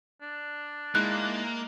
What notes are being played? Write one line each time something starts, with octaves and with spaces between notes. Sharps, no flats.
D4
G#3 A#3 D#4 E4 F#6